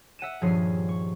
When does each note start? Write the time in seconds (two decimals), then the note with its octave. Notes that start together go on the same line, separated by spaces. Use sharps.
0.19 E5 F#5 D#7 E7
0.41 D#1 G2 F3 G#4 C#5 C7
0.89 C#6